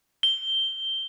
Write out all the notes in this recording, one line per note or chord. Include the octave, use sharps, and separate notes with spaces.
G7